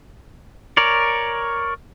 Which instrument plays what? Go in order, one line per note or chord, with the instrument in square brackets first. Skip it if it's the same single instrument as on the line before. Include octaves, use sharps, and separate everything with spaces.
[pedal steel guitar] A#4 C#5 D5